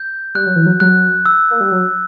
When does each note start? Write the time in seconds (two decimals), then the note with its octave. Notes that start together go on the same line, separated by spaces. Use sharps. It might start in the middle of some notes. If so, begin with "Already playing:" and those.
Already playing: G6
0.35 G3 F#6
0.46 F#3
0.56 E3
0.66 F#3
0.80 F#3 F#6
1.26 E6
1.50 A#3
1.61 G3
1.71 F#3